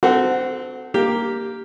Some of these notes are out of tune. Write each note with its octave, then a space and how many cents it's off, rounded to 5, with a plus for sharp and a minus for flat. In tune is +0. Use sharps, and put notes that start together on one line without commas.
C4 -25 F#4 +0 A4 +5
A#3 +0 G4 +0